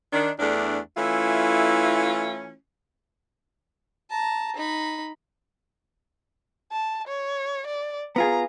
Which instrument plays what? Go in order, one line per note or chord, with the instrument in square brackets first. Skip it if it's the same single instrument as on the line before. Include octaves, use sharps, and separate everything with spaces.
[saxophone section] D#3 D4
E2 A3 D4
E3 A3 C#4 E4 F4
[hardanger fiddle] A5 A#5
D#4 B5
[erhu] A5
C#5
D5
[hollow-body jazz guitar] B3 F4 G#4 [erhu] A#5